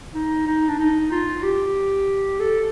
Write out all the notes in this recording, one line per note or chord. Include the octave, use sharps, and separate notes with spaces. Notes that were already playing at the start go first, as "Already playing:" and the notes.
D#4
D#4
D4
D#4
F4
G4
A4